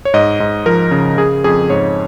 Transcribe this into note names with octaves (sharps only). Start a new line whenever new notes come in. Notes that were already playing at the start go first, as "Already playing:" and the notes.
C#5
G#2 D#5
G#2
F3 A#4
C#3
C#3 G#4
F2 G#4
G#2 C#5